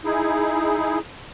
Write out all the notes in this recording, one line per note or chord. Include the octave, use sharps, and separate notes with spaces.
D#4 E4 G#4